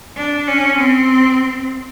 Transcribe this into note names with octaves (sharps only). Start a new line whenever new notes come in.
D4
C#4
C4